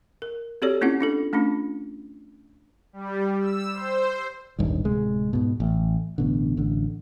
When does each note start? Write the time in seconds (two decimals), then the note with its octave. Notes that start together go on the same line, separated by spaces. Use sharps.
0.22 A#4
0.62 C4 F#4 G4 A4 C#5 D5
0.81 A#3 C4 C#4 E4 F4 F#5
1.01 D4 F4 A4
1.33 A3 C#4 D4 F4
2.93 G3
3.41 E6
3.73 C5
4.59 D#1 G#1 G2 D#3
4.84 D1 C3 G#3
5.33 G#2 B2
5.60 A1
6.18 A1 B2 D3
6.57 A1 D3